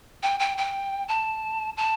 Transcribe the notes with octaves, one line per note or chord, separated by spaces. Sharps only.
G5
G5
G5
A5
A5